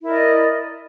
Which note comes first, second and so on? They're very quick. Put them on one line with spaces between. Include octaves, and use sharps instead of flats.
E4 A#4 D5 D#5